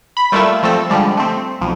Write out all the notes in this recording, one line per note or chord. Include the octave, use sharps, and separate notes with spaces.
B5
G3 A3 A#3 E4 F4 E5
F3 A3 C4 A4
D3 F3 G3 G#3
A3 C4
B1 F2